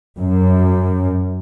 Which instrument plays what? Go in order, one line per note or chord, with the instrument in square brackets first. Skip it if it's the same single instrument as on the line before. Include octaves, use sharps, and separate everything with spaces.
[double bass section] F#2